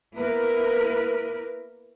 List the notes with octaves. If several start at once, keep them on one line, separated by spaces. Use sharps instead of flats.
A#3 B3 E4 A#4 B4